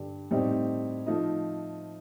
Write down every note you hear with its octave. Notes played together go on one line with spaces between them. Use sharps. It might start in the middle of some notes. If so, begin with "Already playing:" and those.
Already playing: G2 D3 G3
A2 G3 C4 D#4
F3 A3 D#4